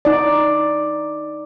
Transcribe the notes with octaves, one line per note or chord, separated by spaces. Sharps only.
D#4 D5